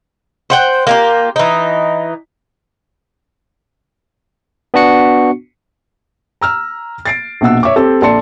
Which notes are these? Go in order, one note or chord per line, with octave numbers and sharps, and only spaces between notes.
C5 F#5 G5
A#3 F4 G4
E3 D#4
B3 D4 F#4 C#7
A#5 E6 F6
A6 C7 D7
A#1 B2 F#5 E6
C#5 E5 C#6 D6
C4 G4 A4
A#1 A4 D5 A5 C6 C#7